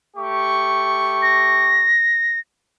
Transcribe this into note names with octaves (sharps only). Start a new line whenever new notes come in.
A3 G4 C#6
A#6